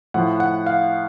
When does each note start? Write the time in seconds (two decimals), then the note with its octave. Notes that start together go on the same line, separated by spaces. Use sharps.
0.14 A2 F3 F#5
0.40 F#5
0.66 F5